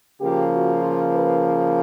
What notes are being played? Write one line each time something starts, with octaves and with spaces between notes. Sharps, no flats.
C#3 F3 A#3 G4
F#4
F4
B4